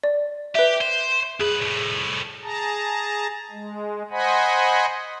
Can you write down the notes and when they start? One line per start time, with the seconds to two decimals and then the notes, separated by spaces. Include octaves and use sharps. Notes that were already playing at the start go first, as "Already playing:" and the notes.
0.04 D5
0.55 G4 B4 E5
0.81 C5
1.40 F#2 G#4 B4
1.61 C2 A2
2.43 G#4 A5 A#5
3.51 G#3
4.11 C5 D#5 F#5 G#5 B5